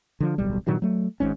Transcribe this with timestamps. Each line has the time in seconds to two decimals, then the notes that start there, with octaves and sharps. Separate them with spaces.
0.20 D3 F3
0.38 D1 B1 G3
0.67 G2 A#2 D#3 F#3
0.82 F#3 A3
1.20 G#1 G#2 C#4